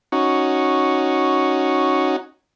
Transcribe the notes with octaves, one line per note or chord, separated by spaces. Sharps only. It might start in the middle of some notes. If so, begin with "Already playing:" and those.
C#4 D#4 F#4